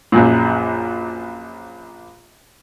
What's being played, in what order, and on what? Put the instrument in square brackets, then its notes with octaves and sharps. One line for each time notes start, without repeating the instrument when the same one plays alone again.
[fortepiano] A#1 F#2 A#2